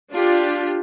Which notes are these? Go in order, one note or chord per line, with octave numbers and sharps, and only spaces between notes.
D4 F4 G4